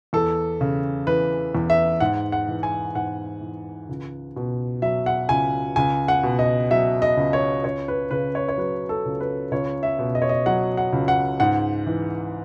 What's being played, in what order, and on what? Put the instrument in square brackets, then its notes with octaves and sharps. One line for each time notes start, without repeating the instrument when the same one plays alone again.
[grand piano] E2 A4
C#3
E3 B4
E2
E5
G#2 F#5
F#5
E3
G#5
G#2 F#5
E3
C#2
B2
F#3 E5
F#5
C#2 G#5
C#2 G#5
F#5
B2
D#5
F#3 E5
D#5
C#2
C#5
C#2 C#5
B4
C#3 B4
C#5
C#5
F#3 B4
A4
C#2
B4
C#2 C#5
E5
B2
D#5
C#5
D#5
F#3 F#5
F#5
C#2
F#5
G#2 F#5
E3